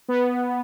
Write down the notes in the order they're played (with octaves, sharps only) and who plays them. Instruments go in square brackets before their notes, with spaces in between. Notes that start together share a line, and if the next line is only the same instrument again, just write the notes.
[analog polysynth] B3